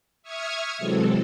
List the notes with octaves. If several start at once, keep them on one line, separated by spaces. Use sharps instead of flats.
E5 C#6 D#6 F6 G#6
C3 E3 F#3 G#3 C4 A4